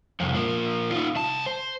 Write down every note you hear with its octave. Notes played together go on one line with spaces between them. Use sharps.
C2 F2
F3 A#3
D#4 F4
C2 A5
C5